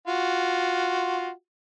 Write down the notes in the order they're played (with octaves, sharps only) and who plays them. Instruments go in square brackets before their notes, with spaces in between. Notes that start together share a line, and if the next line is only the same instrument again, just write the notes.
[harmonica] F4 F#4